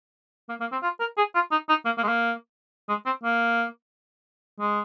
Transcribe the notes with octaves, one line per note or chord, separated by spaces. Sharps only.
A#3
A#3
C4
F4
A#4
G#4
F4
D#4
D#4
A#3
A#3
G#3
A#3
G#3
C4
A#3
G#3